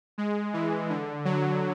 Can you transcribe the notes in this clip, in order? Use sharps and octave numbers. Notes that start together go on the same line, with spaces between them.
G#3
E3
D3
F#3